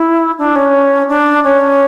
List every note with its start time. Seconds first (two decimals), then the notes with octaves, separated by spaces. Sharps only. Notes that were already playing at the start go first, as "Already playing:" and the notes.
Already playing: E4
0.38 D4
0.55 C#4
1.08 D4
1.43 C#4